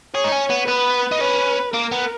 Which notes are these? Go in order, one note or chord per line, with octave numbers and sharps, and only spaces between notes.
G#4 C#5
D#4
C#4
B3
B3 B4
D#4
C#4 B4
A#3 A#4
B3